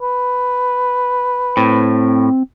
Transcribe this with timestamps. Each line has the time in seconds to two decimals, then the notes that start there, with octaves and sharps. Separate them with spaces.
0.01 B4
1.57 A2 C4